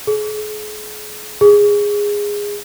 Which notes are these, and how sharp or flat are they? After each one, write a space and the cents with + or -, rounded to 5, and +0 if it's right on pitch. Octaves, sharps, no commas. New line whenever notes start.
G#4 +40
G#4 -15